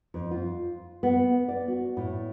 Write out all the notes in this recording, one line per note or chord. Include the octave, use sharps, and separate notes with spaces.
F2
F4
B3
D5
F#4
A2